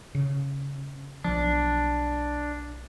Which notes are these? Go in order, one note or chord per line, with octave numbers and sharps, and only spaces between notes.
C#3
B1 F3 D4